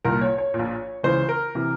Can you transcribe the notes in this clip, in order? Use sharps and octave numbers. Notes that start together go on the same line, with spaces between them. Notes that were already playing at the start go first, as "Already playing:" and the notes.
C2 A#2 A#4
C#5
C#5
A#2
A#1
C#2 C#3 E3 C5
A#4
C3 E3